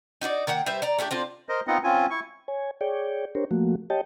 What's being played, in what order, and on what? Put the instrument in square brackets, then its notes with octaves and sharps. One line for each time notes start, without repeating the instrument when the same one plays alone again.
[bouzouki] D#4 F#4 C5 D5
D#3 A#3 F#5 G5
G3 B4 C5 E5
D5 A#5
A3 D4 F4 G4
C4 D4 F4
[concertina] A#4 C5 D#5
B3 C4 D#4 F4 D#5 F#5
C4 C#4 F4 G#5
E4 C#6
[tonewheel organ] C#5 G#5
G#4 C#5 D5 G5
D4 G4 A#4 C5 C#5
F3 A3 A#3 F#4
G4 C#5 D#5 G5 A5